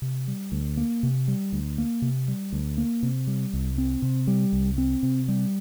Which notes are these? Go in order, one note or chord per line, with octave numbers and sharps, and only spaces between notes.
C3
G3
D2
A#3
C3
G3
D2
A#3
C3
G3
D2
A#3
C3
G3
C2
C4
C3
G3
C2
C4
C3
G3